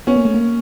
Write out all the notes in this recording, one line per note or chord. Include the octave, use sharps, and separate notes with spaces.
B3 C#4
A#3
A3
A#3